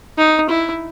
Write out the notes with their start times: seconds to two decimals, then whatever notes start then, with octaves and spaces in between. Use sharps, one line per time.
0.18 D#4
0.49 E4